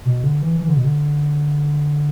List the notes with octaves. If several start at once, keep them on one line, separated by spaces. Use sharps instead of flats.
B2
D3
E3
E3
D3
B2
D3